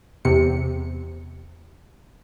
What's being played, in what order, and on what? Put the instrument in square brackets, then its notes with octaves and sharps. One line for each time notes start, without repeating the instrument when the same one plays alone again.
[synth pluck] E2 C3 C#7